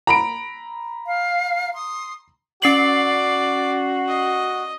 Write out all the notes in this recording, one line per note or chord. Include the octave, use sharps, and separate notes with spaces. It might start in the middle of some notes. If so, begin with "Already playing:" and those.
A#5 B5 D7
F5
C6 D#6
C#4 F#4 D5 C7 F#7
D#5